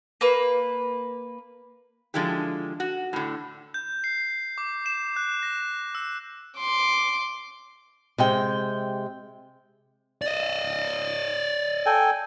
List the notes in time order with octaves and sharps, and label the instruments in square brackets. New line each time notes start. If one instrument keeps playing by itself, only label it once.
[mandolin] A#3 B4
[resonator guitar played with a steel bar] D3 F3 G#3 E4 G4
F#4
A2 D3
[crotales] G6
C7
D6
E7
F#6
A#6
E6
[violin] C6 D6
[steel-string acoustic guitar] C3 G#3 G5
[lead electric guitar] D5 D#5
[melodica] A4 G5 G#5